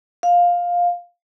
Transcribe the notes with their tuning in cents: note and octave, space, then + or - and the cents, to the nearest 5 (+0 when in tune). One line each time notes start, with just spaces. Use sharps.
F5 +10